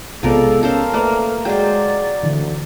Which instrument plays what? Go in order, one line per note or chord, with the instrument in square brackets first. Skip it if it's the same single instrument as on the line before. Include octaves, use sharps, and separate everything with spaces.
[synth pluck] B1 C3 B3 [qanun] F3 A#4 D5 [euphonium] G#3 [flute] A4
[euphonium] C#4 [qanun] A4 C5 F5 [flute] A#4
[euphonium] A3 [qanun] A#3 [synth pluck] B4 D5 E5
[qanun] F#3 C5 [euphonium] G#3 [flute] D5 [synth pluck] G5
[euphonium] D2 [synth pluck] D3 E3